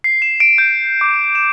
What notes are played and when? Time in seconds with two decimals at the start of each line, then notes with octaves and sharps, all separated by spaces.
0.04 C7
0.22 E7
0.40 D7
0.58 G6
1.01 D6
1.35 E7